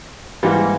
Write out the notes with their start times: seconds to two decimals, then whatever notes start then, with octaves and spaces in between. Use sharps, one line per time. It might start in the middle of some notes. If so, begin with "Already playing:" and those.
0.43 G#2 E3 G3 A#3